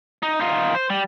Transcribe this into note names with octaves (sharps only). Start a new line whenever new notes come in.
D#4
D#4 F4
C5
G3